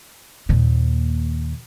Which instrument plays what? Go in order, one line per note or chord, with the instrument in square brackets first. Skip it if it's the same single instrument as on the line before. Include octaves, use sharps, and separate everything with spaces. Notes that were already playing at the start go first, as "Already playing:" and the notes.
[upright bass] D#2 A#2